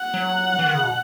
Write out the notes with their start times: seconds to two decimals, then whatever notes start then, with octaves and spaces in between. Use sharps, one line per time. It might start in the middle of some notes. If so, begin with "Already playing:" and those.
Already playing: F#5
0.14 F#3
0.59 E3
0.66 D#3
0.75 C#3
0.83 B2